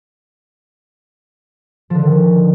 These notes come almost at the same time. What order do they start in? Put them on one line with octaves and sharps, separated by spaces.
F3 D3 D#3